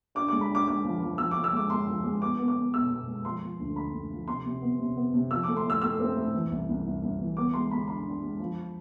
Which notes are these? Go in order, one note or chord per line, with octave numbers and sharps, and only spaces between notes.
D4 D6
G#3 D6
B5
D4
D6
G#3 D6
F3
F3
F3 E6
D6
F3
E6
G#3 D6
G#3 C6
F3
G#3
B3 D6
B3
D6
B3
B2 E6
B2
G#3
F3 C6
F3
D2
D2 B5
D2
F3
C3 C6
C3
B3
C3
B3
C3
F3 E6
D6
A3
C6
A2
E6
A3 E6
C4
A2
E3
C2
C2
C2
C2
E3
B3 D6
G#3 C6
G#3 B5
D4 B5
D4
G#3
F3